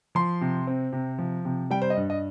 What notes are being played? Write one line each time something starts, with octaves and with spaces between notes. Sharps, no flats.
F3 C6
C3
C4
C3
F3
C3
G3 G5
C5
D#5
G2
D#5